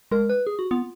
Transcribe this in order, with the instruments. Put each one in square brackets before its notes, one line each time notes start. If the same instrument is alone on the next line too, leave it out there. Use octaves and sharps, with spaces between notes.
[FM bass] G#3 [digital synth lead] A#4
[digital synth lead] B4
G#4
F#4
[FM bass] B3 [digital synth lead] F4